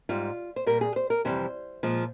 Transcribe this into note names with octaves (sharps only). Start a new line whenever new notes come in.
G#2 G3 F4
C5
A#2 G3 A#4
G#4
C5
A#4
F2 C3 E3 G3 C5
A#2 F3 G#3